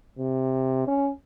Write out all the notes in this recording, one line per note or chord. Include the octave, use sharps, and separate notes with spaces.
C3
C#4